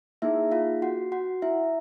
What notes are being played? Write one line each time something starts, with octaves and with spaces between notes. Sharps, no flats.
A#3 D#4 E4 G#4 E5
F4 F5
F#4 F#5
F#4 F#5
E4 E5